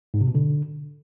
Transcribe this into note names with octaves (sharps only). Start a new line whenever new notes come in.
G#2
C3
B2
D3